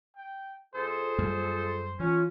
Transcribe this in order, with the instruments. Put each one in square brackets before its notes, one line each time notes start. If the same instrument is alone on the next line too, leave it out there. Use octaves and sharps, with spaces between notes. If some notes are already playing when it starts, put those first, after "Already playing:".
[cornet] G5
[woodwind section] F2 G#4 A4 [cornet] C5
[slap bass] F#2 G3 A#3
[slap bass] E3 [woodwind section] C#4 [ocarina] F4